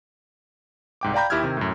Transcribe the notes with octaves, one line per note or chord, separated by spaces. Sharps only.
C2 G#2 G5 D6
D5 F5 G5 A#5 B5 G6
D#2 E4 G4 E6 F6 G#6
C3 D#3
F#2 A2